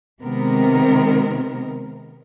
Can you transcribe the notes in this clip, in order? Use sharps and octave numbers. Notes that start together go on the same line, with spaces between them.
C3 D#3 G#3 B3 C4 A#4